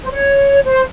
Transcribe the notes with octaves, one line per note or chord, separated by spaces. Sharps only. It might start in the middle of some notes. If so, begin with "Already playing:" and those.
C5
C#5
C5